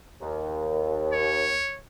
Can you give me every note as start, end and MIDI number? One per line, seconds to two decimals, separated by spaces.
0.20 1.62 39
1.13 1.79 73